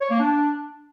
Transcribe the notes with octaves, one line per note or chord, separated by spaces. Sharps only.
C#5
A#3
D4